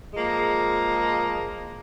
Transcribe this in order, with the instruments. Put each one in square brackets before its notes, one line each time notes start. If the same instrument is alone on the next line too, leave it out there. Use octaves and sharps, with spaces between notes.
[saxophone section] F3 G#3 A#3